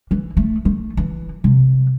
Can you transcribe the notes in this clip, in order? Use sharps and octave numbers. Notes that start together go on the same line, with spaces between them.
E3
A3
A3
E3
C3